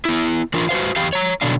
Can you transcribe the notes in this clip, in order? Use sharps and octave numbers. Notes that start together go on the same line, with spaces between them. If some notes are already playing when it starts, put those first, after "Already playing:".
B3 E4
E3 D4 F4 A#4
F#4 B4 C5 F5
E2 G4 F5
C#5 A#5
B2 D3 F#3 D4 F5